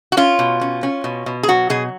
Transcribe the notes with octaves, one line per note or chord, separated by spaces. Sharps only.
F#4
C#4 F4
B2
C#4
C#4
B2
B2
G#4
F#3 F#4
B2 G#4